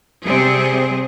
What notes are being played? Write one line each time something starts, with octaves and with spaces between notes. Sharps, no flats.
C3 G3 C4 G#4